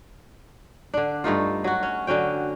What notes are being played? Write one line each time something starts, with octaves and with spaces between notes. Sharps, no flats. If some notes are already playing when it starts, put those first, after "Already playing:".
D3 D4
G2 A3 D#4 F4
F#3 F#4
C#4
D3 F#3 C#4 G5